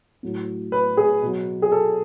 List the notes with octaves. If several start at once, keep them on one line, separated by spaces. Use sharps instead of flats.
A2 F#3
B4
G#4
B2 F#3
G#4
A4